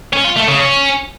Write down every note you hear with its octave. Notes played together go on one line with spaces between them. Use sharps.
C#4
F4
A3
C#3
C#4